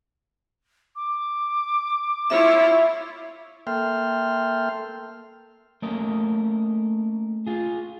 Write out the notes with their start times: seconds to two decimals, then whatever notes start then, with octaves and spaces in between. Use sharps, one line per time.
0.96 D6
2.30 E4 F4 C#5 E5
3.67 A#3 A4 E5 G5 C6 F6
5.82 A3 A#3 C#4 A#4 D#5
7.47 F4 G#4